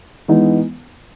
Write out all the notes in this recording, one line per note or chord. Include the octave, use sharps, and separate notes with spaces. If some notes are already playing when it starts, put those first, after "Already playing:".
E3 G#3 B3 D#4